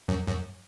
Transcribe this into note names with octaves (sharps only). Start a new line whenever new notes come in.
F#2
F#2